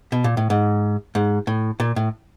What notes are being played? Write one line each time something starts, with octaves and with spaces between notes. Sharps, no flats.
B2
A#2
A2
G#2
G#2
A2
A#2
A2